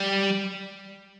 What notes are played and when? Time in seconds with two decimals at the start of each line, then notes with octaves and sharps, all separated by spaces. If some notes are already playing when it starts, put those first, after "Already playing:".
Already playing: G3